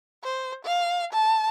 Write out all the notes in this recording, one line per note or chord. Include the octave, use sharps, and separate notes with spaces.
C5
F5
A5